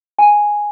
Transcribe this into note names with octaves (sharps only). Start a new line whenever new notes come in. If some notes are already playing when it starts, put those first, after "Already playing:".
G#5